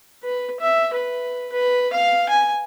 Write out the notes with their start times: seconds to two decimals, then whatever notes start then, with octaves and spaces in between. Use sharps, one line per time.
0.23 B4
0.60 E5
0.93 B4
1.52 B4
1.93 F5
2.29 G#5